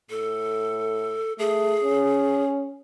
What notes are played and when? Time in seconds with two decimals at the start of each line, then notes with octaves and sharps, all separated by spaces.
0.10 A2 A4
1.39 A3 G#4
1.84 C#4